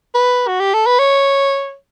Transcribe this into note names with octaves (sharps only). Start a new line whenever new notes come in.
B4
F#4
G4
A4
B4
C#5